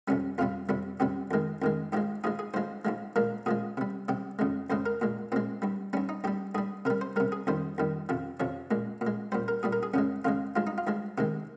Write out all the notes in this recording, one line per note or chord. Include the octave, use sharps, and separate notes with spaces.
F2 C3 G3 C#4
F2 C3 G3 F4
F2 C3 G3
F2 C3 G3 G4
F2 D#3 G#3
F2 D#3 G#3
G#2 F3 G#3 G4
G#2 F3 G#3 G#4
G#4
G#2 F3 G#3 C5
G#2 F3 G#3
A#2 F3 G#3 A#4
A#2 F3 G#3 G#4
C3 G3
C3 G3 G4
F2 C#3 G#3
F2 C#3 G#3 C5
A#4
A#2 G#3
A#2 G#3 C4
G2 G3
G2 G3 C#4
D#4
G2 G3 G4
G2 G3 G#4
C3 G3 A#4
C5
C3 G3 A#4
G#4
F2 D#3 G3 C5
F2 D#3 G3
F2 C3 F3
F2 C3 F3 C#5
A#2 G#3
A#2
G#3
A#2 G3 C5
A#4
A#2 G3 G#4
A#4
G#4
F2 C#3 G#3 C#4
F2 C#3 G#3 F4
G2 F3 G#3 F4
D#4
F4
G2 F3 G#3
C3 D#3 G#3 G4